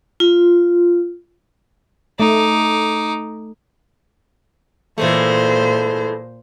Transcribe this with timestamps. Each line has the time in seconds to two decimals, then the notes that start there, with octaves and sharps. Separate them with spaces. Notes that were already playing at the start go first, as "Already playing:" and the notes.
0.20 F4
2.20 A3 D#4 D6
4.98 A#2 E3 G#3 A3 C5